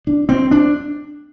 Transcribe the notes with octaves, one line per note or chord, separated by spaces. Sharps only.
D4
C4
D4